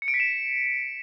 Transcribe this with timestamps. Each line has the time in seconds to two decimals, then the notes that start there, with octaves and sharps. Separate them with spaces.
0.02 C#7
0.08 D7
0.14 B6
0.20 E7